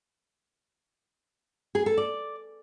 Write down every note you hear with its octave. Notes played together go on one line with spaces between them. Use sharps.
G#4
A4
D5